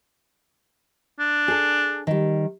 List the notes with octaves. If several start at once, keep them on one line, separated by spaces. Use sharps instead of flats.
D4
G#4 A4
D#3 G3